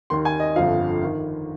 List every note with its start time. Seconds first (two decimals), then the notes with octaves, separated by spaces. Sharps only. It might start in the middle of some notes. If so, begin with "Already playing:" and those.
0.10 D#2 D#3 C6
0.25 G#5
0.40 D#5
0.56 G1 F2 D3 F3 F5
1.04 D#3